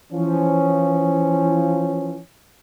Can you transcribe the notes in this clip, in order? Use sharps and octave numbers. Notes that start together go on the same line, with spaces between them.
E3 F3 C#4